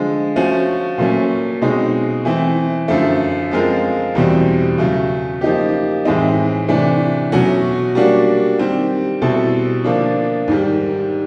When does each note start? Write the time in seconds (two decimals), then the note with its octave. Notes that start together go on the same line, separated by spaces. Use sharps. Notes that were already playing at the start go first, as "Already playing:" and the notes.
Already playing: D3 F3 G#3
0.36 F3 A3 C#4 F#4
0.98 A#2 F#3 A3 C#4
1.61 B2 G#3 C4 D#4
2.25 E3 A3 C4
2.88 F#2 D3 F3 A3
3.51 F3 G#3 C4 F4 A#4
4.15 E2 B2 G3 C4
4.78 C#3 F#3 A3
5.41 F3 A#3 D#4 G4
6.05 A2 E3 G#3 C4 D#4
6.69 C3 E3 A3 D4
7.32 B2 F#3 A3 C#4 F#4
7.95 G3 A#3 D4 F#4
8.59 D#3 G3 C4
9.22 B2 G3 C4 E4 A4
9.84 D3 F3 A#3 D4
10.48 G#2 D#3 G3